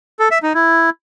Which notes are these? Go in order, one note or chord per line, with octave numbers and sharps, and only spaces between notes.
A4
E5
D#4
E4